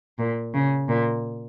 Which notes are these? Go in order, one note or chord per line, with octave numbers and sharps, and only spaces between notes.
A#2
C#3
A#2